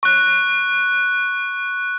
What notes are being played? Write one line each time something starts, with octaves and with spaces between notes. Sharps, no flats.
C#6 F#6